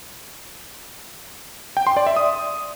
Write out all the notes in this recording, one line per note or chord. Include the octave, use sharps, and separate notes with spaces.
G5
C6
D5
E5
D#6